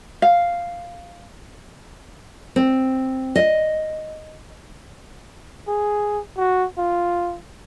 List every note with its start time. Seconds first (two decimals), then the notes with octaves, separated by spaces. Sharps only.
0.22 F5
2.56 C4
3.36 D#5
5.67 G#4
6.37 F#4
6.78 F4